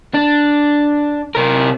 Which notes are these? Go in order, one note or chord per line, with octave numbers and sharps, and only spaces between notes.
D4
C3 A#4